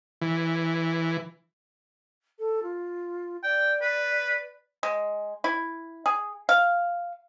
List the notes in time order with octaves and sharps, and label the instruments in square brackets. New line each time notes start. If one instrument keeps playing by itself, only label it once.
[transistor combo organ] E3
[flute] A4
F4
[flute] D5 [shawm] G5
[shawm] B4
[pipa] G#3
E4
G#4
F5